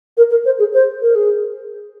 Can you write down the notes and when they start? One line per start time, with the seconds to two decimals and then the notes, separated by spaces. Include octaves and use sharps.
0.17 A#4
0.31 A#4
0.45 C5
0.59 G#4
0.73 C5
1.01 A#4
1.15 G#4